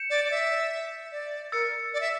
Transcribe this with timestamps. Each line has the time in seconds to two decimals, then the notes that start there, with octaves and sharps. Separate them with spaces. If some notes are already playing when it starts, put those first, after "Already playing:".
Already playing: G6 C#7 E7
0.10 D5
0.24 D5
0.31 E5
1.12 D5
1.52 A#4 E6 A6 C#7
1.94 D5
2.01 E5